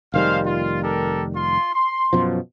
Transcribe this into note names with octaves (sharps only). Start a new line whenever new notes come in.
F1 D#3 G3 G#3 C5 F5
F4
G4 A4 A#4
F4 C6
C6
F#2 B2 F3